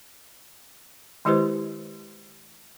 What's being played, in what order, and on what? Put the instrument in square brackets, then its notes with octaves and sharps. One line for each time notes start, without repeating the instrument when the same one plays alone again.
[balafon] D#3 G#3 E4 G4 B4 C5